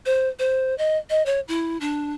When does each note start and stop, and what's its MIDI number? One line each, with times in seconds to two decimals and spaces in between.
0.06 0.29 72
0.39 0.77 72
0.78 0.97 75
1.10 1.25 75
1.26 1.40 73
1.48 1.78 64
1.81 2.15 62